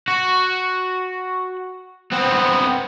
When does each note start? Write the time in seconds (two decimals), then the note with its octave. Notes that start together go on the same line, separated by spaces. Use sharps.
0.08 F#4
2.12 B3 C4